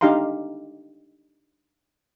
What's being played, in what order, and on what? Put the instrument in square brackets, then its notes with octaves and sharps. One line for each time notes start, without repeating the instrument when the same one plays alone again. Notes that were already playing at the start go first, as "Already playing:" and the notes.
[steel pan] D4 D#4 G4 F5 A#5 C6